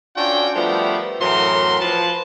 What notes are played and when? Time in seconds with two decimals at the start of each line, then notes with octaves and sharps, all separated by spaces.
0.17 C#4 D4 F4 F#4 A4 G5
0.56 F3 G3 A3 B3 G4 A#4
1.21 F#2 A2 E3 F#3 A#4 C6
1.80 F3 B4 A5